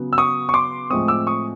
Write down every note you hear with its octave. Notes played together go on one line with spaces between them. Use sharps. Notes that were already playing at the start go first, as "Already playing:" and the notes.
Already playing: C#3 F#3 B3
E6
C#6 D#6
C#6
C6 D6
A2 F3 G#3 C4 C#6 D#6
D6 E6
C#6 D#6